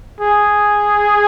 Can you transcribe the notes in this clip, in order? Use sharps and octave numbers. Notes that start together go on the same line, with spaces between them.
G#4